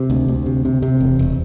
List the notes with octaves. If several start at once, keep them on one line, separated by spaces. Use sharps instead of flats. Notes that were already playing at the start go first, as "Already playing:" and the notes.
Already playing: C3
D2
D2
C3
C3
C3
E1
E1